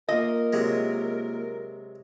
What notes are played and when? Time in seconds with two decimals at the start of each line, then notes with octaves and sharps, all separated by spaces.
0.09 A#3 F4 A#4 D#5
0.53 C3 F#3 G#3